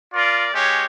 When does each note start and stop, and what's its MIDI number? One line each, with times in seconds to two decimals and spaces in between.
0.14 0.49 65
0.14 0.49 70
0.14 0.49 74
0.54 0.84 56
0.54 0.84 61
0.54 0.84 67
0.54 0.84 73